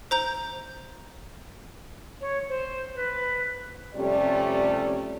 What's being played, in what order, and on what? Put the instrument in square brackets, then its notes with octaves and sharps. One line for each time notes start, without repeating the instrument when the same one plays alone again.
[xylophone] C5 A#5 G6
[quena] C#5
C5
B4
[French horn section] F2 C3 G3 A3 C#4 D5